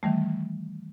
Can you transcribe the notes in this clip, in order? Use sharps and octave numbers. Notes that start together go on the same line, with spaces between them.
D#3 E3 G3 A3